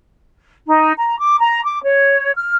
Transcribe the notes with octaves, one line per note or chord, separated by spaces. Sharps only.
D#4
A#5
D6
A#5
D6
C#5
F6